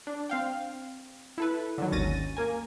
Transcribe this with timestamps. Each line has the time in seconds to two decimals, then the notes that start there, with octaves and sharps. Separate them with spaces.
0.07 D4
0.29 C4 F5 G5
1.38 E4 A4 B4
1.78 D3 D#3 F#3
1.91 G#1 D#2 C#4 A6 A#6 D#7
2.37 A#3 A#4 G#5